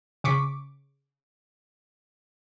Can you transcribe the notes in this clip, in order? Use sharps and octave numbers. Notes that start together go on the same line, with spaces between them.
C#3 C#6 D6 B6